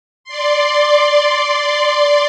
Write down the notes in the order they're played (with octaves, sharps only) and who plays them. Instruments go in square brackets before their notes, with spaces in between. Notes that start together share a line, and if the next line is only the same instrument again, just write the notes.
[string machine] D5 C6